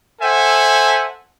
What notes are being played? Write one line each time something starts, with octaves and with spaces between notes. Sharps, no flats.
A4 C5 E5 F#5 G#5 A5